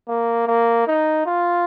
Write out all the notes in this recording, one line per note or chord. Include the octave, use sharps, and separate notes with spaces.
A#3
A#3
D#4
F4